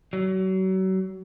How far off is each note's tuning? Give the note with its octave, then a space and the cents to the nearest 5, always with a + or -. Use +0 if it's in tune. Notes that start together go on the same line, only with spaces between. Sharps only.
F#3 +35